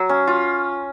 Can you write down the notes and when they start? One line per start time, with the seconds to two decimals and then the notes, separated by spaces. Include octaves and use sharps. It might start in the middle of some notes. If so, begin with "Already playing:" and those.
Already playing: F#3
0.09 C#4
0.27 F4